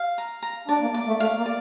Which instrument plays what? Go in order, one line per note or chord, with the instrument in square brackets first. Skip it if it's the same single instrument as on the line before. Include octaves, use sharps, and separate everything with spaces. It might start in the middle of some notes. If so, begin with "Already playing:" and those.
Already playing: [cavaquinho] F5
A#5
A#5
[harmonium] D4 [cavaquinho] D5
[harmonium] A#3
[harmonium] A#3 [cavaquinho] D5
[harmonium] A3
[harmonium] A3 [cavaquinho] F5
[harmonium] A#3
[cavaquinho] D5